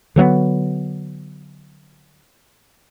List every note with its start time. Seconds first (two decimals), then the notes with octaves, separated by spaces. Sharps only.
0.16 D3 F#3 A#3 B3